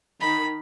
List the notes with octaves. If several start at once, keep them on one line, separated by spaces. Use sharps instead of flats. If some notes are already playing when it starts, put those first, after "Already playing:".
D#3 B5